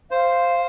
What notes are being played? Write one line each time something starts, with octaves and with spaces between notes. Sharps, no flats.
C5 F5